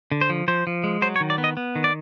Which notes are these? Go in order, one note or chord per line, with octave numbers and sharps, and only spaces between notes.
D3
C5
F3
F3 C5
F3
G#3
F#3 C5
C#5
D#3
D5
B3
D#5
B3
D#3
D5